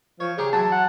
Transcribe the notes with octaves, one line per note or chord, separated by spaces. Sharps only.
F3 C#5
C#3 G4 G#4 A#5
E3 F#3 A5
F#5